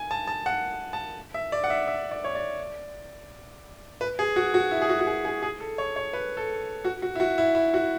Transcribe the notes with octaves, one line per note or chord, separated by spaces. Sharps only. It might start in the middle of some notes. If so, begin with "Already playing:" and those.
Already playing: G#5
A5
A5
F#5
A5
E5
D5
F#5
E5
E5
D5
C#5
D5
B4
G#4
F#4
F#4
E4
G#4
F#4
F#4
G#4
G#4
G#4
A4
C#5
C#5
B4
A4
F#4
F#4
E4
F#4
E4
E4
F#4